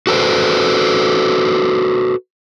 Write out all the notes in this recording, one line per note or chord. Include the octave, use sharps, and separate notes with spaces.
F#4 A4 B4 C5